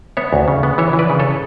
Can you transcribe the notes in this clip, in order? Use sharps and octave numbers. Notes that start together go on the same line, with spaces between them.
B3 C#5 E5
D2
C#3
B3
E3 C#5 E5
E3
B4 D5
C#3
A4 C#5